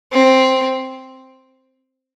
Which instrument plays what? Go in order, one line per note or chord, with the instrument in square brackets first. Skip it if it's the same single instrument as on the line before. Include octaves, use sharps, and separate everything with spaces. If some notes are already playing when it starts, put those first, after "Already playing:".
[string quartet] C4